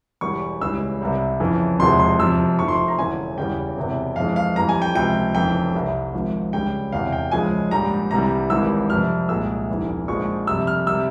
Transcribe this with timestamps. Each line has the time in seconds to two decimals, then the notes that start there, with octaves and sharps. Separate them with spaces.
0.21 E1 E2 E3 G3 C#6
0.61 C#2 C#3 E3 G3 E6
1.01 C2 C3 G3
1.40 F2 C#3 E3
1.79 E1 E2 C3 F3 G#3 C6
2.00 C6
2.19 F2 C3 F3 E6
2.58 F1 F2 C3 F3 C#6
2.68 C6
2.88 A#5
2.98 E1 E2 C#3 E3 G#5
3.38 E2 C#3 E3 G3 G5
3.77 E1 E2 C3 E3
4.16 F2 E3 G#3 F5
4.36 F5
4.56 F2 E3 G3 A#5
4.69 G#5
4.82 G5
4.95 C#2 C3 F3 G5
5.35 F1 F2 C#3 E3 G5
5.74 C2 C3 G3
6.14 G#1 G#2 F3
6.53 C#2 C#3 G3 G5
6.92 E1 E2 C3 F5
7.13 G5
7.32 C#2 C#3 F3 G#3 G#5
7.71 A#1 G#2 G3 A#5
8.11 C2 C3 E3 G3 A#5
8.50 G#1 G#2 E3 G3 E6
8.90 F2 C3 G3 F6
9.29 C2 A#2 G#3 E6
9.68 F1 E2 E3 G3
10.08 A#1 G#2 F3 G#3 C#6
10.47 F2 C3 G3 E6
10.67 F6
10.87 C3 G3 E6